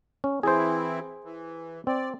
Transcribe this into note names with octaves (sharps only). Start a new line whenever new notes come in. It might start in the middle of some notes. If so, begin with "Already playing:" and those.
C#4
E3 C4 E4 G#4 C5
E3
C4 D5